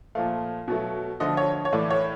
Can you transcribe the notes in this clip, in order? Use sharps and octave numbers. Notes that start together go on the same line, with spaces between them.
A#2 F3 A3 F5
B2 F#3 A3
D3 F3 A3 D#5
C#5
C#5
A2 E3 A3 D5
C#5